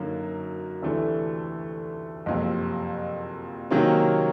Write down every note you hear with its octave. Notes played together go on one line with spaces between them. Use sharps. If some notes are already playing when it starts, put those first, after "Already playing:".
Already playing: F#2 D3 F#3 A#3 D#4
D2 C3 E3 A3 D4
F#1 F2 C3
C3 D#3 F#3 A#3 C#4